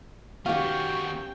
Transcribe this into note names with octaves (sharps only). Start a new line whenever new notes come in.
D#3 B3 C#4 F#4 G4 F5 G5